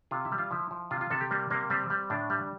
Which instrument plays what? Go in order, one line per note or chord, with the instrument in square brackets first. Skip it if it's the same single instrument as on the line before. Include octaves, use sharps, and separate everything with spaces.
[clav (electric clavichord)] C3 F4
E4
G3
F4
F3 E4
F3
C3 F4
F4
C3 A4
G4
G3 A#3
C3 A#3
G3 C4
G3
A2 D4
G3